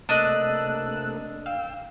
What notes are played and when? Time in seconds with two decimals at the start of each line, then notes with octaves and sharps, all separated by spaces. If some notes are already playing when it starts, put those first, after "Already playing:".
0.09 C3 A3 A#3 D4 D#5 E6 F#6
1.46 F5 G5 E6